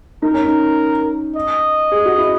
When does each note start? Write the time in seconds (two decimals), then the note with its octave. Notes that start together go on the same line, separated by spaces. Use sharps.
0.22 D#4 A#4
0.34 C#4
0.46 D#4
1.36 D#5
1.92 G#4
2.06 F#4
2.18 E4